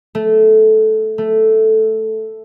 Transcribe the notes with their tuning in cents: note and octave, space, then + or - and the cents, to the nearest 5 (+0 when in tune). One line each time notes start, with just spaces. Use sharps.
A3 -10
A3 +0